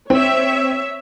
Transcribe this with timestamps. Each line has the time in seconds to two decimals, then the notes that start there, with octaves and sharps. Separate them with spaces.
0.10 C4 C#5 E5